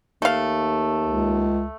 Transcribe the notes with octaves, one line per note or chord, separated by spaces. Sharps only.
D#2 A3 F5
C#2